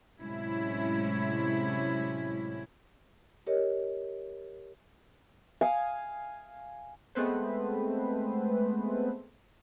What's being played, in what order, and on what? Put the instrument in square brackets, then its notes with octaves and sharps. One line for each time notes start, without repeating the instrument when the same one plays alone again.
[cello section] A2 C3 F#3 G#3 C#4 E4
[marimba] G4 A#4 C#5 D#5
[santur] F5 G#5 D#6
[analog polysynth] G#3 A3 B3 C4 B4 C5